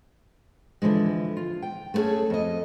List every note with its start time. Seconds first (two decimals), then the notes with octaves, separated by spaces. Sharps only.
0.82 D3 E3 F3 G#3
1.37 F4
1.62 G5
1.94 A3 B3 C#4 G#4 A4
2.30 F2 D#5